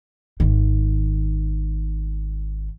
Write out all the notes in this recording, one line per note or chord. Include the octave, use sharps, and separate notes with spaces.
G#1 D#3